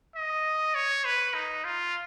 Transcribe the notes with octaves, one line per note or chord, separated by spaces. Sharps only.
D#5
C#5
B4
D#4
F4